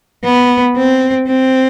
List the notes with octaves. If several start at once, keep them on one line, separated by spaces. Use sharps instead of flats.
B3
C4
C4